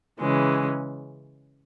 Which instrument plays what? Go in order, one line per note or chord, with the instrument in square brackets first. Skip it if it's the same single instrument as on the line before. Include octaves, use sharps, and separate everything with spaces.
[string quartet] C#3 E3 G#3 C#4